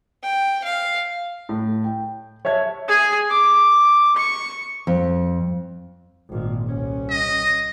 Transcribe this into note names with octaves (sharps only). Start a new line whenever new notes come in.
G5
F5
A2
G5
C#5 E5 A5 G#6
G#4 G#5
D6
C#6
F2
G#1 A#2
C2 C#4
D#5